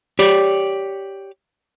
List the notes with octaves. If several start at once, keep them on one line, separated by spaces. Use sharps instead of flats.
G4 C#5 D5